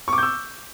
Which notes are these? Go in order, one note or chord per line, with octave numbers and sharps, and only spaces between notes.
C#6 D6 E6 G6